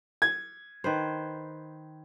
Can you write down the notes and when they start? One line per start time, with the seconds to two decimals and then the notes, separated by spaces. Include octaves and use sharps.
0.22 G#6
0.84 D#3 B4 C5